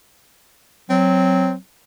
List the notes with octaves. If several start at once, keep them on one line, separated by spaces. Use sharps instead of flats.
F#3 C4